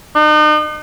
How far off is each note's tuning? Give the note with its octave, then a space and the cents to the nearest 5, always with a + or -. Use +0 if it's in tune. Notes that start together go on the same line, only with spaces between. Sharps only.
D#4 -40